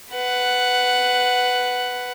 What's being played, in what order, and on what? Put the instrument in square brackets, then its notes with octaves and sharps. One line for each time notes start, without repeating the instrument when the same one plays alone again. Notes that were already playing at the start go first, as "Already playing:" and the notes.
[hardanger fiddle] B4 F#5